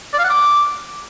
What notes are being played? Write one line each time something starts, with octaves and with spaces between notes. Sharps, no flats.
D5
F5
F#5
D6